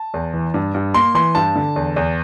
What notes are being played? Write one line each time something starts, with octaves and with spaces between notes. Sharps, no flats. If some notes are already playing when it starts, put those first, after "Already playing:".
Already playing: A5
E2
E3
G2
G2
A#3 C6
E3 C6
G2 A5
D3
E2
E2